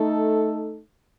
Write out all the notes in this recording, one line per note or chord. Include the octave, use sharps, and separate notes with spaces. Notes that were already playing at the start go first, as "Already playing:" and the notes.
Already playing: A3 D#4 A4